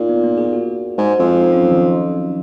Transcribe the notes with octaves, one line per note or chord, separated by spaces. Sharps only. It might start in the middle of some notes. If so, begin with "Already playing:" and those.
Already playing: A#2 D#4 F4
B3
A#3
G#4
F#4
G#2
F2
D#4
C#4
F#3
D#3
F3